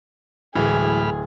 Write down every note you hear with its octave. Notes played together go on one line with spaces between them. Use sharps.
D1 A2 E3 F#3 G#3 G#4 B5 F6